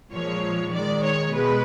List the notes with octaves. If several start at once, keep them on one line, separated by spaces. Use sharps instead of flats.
A#2 F3 G#3 C#5
D#3 G#3 D5
C#5
B2 G#3 B4